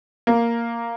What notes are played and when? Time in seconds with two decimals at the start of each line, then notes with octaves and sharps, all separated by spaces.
0.27 A#3